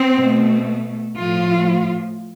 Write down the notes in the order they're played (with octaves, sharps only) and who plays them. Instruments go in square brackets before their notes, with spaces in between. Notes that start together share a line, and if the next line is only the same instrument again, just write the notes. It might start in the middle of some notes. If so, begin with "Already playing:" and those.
Already playing: [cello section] C4
B2 A3
A2 F3 A3 F4